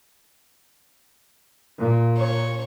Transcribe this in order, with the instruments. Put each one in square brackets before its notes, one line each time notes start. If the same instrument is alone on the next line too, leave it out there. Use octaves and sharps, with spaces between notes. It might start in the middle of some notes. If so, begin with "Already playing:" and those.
[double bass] A#2
[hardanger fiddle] C#5